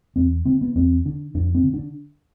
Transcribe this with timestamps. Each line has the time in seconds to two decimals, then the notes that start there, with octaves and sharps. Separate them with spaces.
0.16 E2 C4
0.45 D3 C4
0.61 B3
0.75 E2 C4
1.05 D3 D4
1.34 F2 D4
1.55 C4
1.64 D3
1.74 D4